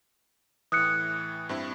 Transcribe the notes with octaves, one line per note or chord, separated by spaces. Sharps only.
A2 E3 D#6 F#6 C#7
G2 C4 E4